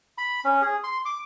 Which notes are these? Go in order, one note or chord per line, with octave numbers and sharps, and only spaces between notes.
B5
C#4
G#4
C6
D6